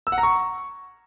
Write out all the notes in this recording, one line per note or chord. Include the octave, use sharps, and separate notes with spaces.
E6
F#5
A#5
C#6